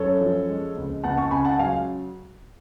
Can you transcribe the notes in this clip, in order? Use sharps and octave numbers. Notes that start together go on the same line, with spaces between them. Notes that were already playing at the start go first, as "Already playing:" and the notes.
Already playing: F#2 C#4 A4 C#5
F3
G#3
C#2
C#2 F#5 A5
A5 C#6
C#3 G#5 B5
F#5 A5
F#3 F5 G#5